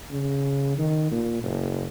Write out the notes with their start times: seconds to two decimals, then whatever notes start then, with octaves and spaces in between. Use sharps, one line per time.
0.11 C#3
0.78 D#3
1.11 A#2
1.43 F#1